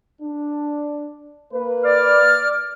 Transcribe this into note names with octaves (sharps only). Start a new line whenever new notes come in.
D4
A#3 B4
D5 F6